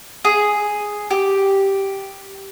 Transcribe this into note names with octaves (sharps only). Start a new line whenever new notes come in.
G#4
G4